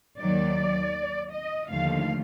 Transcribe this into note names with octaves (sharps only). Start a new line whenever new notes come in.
D#2 D#3 F#3 D5
D#5
D#2 D3 F3 A3 F5